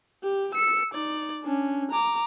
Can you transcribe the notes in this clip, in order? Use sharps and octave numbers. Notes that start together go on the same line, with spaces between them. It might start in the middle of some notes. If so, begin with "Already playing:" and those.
G4
E6 C#7
D#4 D5
C#4 D4
A#5 D6